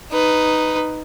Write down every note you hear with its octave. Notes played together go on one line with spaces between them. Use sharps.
D#4 B4